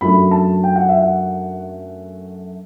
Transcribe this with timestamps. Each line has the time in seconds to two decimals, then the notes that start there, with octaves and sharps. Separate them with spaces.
0.01 F#2 F#3 A3 D4 B5
0.31 A5
0.64 G5
0.76 F#5
0.89 E5
1.02 F#5